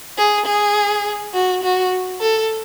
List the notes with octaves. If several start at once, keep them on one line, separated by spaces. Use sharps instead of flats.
G#4
G#4
F#4
F#4
A4